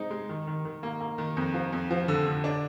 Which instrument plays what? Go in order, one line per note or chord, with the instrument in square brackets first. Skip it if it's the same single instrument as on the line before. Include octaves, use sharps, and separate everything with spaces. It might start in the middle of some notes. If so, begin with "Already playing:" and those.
Already playing: [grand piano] G#3 C4 D#4
G#3
D#3
D#3
D#3
A#3
A#3
D#3
F2
F3
F2
F3
D3
D3
D4